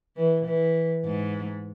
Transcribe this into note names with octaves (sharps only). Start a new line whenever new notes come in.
E3
E3
G#2